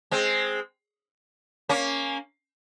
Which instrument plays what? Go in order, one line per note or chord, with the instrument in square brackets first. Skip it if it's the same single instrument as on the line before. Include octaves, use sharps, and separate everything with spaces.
[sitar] G#3 C4
A#3 C#4